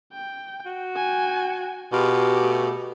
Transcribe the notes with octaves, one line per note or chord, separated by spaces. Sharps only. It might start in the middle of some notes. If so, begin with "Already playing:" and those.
G5
F#4
G5 G#5
B2 F4 G4 G#4
A3